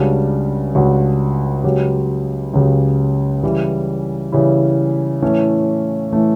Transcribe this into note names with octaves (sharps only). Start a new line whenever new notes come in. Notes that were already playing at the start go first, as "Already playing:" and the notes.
Already playing: C#2 C#3 G3 D4 F#4
C#2 C#3 G3 D4 F#4
C#2 C#3 F#3 C#4 G4
C#2 C#3 F#3 C#4 G4
C#3 E3 G3 C#4 E4
C#3 E3 G3 C#4 E4
A2 E3 A3 C#4
A2 E3 A3 C#4